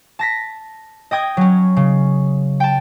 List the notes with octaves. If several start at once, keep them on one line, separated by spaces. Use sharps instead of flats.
A5 A#6 B6
D#5 G5 D#6 G#6
F#3 C#4
C#3
G5 A5